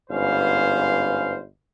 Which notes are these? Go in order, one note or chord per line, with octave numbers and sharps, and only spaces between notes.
G1 G#2 C#4 B4 C5 F5